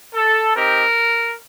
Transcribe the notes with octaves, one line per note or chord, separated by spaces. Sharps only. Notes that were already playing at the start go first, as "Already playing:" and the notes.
A4
C4 D#4 G4 A#4